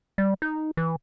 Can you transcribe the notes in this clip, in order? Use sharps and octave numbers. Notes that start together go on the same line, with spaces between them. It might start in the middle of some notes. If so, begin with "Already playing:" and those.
G3
D#4
E3